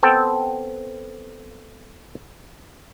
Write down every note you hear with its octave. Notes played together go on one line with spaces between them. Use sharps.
B3 C4 A4 G5